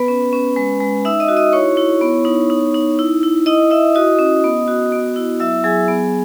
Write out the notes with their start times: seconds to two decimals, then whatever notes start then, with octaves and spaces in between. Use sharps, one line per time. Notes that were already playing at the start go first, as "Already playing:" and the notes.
Already playing: B3 B4 B5
0.08 C#4
0.33 C#4
0.56 G#3
0.81 G#3
1.05 D#4 E5 E6
1.20 D#5 D#6
1.28 F#4
1.37 D#5 D#6
1.52 E4 C#5 C#6
1.77 E4
2.01 B3
2.25 D#4
2.50 D#4
2.74 D#4
2.99 E4
3.23 E4
3.46 E4 D#5 D#6
3.71 E4 E5 E6
3.95 F#4 D#5 D#6
4.19 C#4
4.44 B3
4.68 F#4
4.92 B3
5.16 E4
5.40 F#3 E5 E6
5.64 F#3 G#4 G#5
5.88 B3